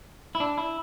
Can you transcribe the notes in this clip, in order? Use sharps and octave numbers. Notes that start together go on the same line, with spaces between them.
E4
D4
E4